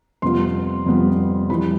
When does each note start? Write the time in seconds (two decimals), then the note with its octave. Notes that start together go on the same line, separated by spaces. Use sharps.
0.22 F2 C3 G3 B3 F4 C6
0.86 F2 C3 G3 B3 F4
1.50 F2 E3 G3 B5